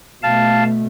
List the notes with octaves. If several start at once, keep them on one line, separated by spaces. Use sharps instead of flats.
B2 A3 F5 A5